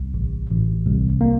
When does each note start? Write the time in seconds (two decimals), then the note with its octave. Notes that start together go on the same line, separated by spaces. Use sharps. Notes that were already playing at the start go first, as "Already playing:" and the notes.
Already playing: C2
0.14 A1
0.50 A1
0.86 C2
1.21 A#3